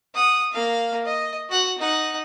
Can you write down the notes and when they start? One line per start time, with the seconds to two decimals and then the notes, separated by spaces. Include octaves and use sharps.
0.15 F#5 D#6
0.52 A#3 F5
1.06 D#5
1.49 F#4 F#5
1.79 D#4 F#5